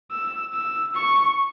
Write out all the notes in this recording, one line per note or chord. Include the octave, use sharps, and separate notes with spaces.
E6
E6
C#6